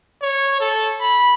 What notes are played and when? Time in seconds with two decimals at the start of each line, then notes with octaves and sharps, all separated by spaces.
0.22 C#5
0.60 A4
1.00 B5